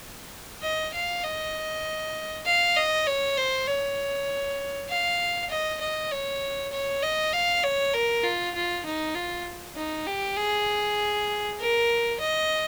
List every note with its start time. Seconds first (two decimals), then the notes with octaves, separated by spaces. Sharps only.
0.63 D#5
0.94 F5
1.24 D#5
2.46 F5
2.76 D#5
3.07 C#5
3.37 C5
3.67 C#5
4.89 F5
5.50 D#5
5.81 D#5
6.11 C#5
6.72 C#5
7.03 D#5
7.33 F5
7.64 C#5
7.94 A#4
8.24 F4
8.55 F4
8.86 D#4
9.15 F4
9.77 D#4
10.07 G4
10.37 G#4
11.60 A#4
12.20 D#5